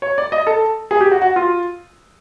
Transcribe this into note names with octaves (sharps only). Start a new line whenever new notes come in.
C#5
D5
D#5
A4
G#4
G4
F#4
F#4
F4